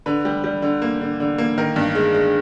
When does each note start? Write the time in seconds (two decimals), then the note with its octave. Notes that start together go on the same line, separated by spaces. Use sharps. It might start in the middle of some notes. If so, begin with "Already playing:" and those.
0.06 D3 B4
0.25 G3
0.44 G3
0.62 D3
0.82 A#3
1.01 D3
1.20 D3
1.38 A#3
1.58 D#3 A#4
1.76 G2
1.95 G#3
2.14 G#3